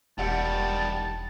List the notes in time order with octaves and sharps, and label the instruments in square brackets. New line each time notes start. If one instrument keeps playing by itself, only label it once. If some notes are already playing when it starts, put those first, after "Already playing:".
[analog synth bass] E1 [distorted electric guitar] D#3 G3 [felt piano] G4 F#5 C#7 [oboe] A5